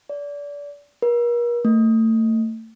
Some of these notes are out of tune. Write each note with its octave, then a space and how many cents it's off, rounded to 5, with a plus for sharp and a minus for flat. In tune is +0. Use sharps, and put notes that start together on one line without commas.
D5 -30
A#4 +40
A3 +30